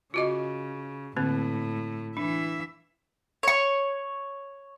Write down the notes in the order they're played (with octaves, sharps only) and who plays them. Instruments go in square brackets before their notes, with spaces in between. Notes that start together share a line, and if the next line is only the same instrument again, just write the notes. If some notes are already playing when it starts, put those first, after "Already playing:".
[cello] C#3 [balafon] F4 F#4 D#5
[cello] A2 [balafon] D3 A#3 C4
[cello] E3 E5 [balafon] D4
[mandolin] C#5 C#6